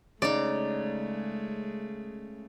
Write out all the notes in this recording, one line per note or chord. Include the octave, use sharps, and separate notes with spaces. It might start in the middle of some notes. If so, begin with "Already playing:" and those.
C#3 G#3 A3 D#4 D5